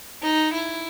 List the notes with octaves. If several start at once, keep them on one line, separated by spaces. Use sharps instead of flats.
D#4
E4